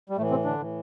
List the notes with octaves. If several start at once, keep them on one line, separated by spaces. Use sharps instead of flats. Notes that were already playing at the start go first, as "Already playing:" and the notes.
G3
A2 E3 A3
C3 C4
D3 D4
A2 E3